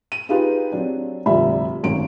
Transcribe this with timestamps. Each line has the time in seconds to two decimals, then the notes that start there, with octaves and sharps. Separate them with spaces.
0.12 D#7
0.29 D#4 F4 G4 G#4 B4
0.72 F#3 C4 D4
1.26 F1 D2 A#2 G3 E5 B5
1.83 G#1 F#2 D7